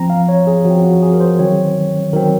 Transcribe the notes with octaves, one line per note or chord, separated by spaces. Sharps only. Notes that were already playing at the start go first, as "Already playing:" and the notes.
Already playing: F3 C4 A#5
F5
C#5
G#4
F3 C4 F#4
F#4
G#4
A#4
C5
D#3 F#3 C4 C#5
D#3 F#3 C4 A#4